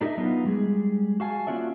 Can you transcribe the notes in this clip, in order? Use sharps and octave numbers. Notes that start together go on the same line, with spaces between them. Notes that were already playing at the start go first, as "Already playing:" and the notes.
D4 D#4 G4 G#4 D#5 E5
F#3 B3 D#4 F4
G3 G#3 G#4
F#4 F5 G#5 A5
A#3 C#4 F4 F#4 D5 E5